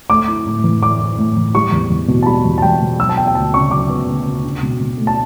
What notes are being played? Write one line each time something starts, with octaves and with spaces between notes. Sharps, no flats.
A3 D6
E4
A2
E3
A3 D6
E4
A2
E3
G3 C#6
E2
E2
B2
A5
G3 B5
E2
A5
E2 G5
B2
F#3 E6
A5
B3 G5
G5
D2 A5
C#3 C#6
F#3 D6
B3
D2
C#3
D4
B2
B2
A3
A5